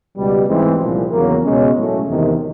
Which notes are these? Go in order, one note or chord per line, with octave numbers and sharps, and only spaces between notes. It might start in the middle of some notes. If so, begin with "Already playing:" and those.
C#2 B2 G3
A1 G#2 E3 G#3 C4
C2 A#2 F3
E2 C#3 F#3 A#3
C#2 B2 G#3 C#4
A2 F#3 A3
E2 C3 D#3